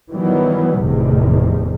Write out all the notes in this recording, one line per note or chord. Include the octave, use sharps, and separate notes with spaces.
D#3 E3 F#3 G3 B3
F1 E2 A2 C3 D#3